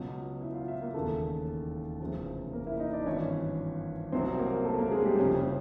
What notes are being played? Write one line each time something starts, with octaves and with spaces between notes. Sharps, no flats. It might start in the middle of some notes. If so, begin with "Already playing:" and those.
Already playing: C#2 B2 F#3
E4 E5
F4 F5
E4 E5
A#3 A#4
E1 D#2 C#3 A3 A4
F1 E2 C#3 F3
A#3 A#4
E4 E5
D#4 D#5
D4 D5
G#1 G2 E3 C#4 C#5
C2 B2 F#3 C4 C5
A#3 A#4
A3 A4
A#3 A#4
G#3 G#4
G3 G4
F#1 F2 C#3 F3 C#4
C#4